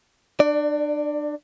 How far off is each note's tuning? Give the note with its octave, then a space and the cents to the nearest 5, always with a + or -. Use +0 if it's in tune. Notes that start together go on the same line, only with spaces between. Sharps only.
D4 +35 D5 +0